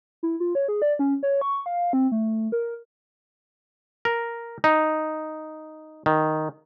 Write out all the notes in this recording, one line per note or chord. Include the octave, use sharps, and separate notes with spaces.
E4
F4
C#5
G#4
D5
C#4
C#5
C#6
F5
C4
A3
A#4
A#4
D#4
D#3